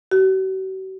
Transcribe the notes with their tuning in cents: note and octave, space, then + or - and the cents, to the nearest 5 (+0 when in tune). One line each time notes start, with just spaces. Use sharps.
F#4 +45